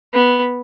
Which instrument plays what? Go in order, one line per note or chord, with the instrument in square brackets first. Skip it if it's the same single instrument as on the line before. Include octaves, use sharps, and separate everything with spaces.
[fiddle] B3